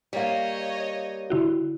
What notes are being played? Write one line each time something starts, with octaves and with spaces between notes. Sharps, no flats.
G3 A#3 C#5 D#5 F5
D3 E4 F#4